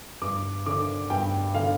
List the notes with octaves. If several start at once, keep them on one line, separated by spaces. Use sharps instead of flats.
G2 D6
D3 D6
G2 G5
D3 F5